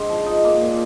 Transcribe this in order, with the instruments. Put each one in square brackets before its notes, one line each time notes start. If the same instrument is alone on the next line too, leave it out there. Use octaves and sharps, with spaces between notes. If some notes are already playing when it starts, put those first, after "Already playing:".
Already playing: [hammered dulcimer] G#2 C4 D4
F3
D#4
A#3
A#2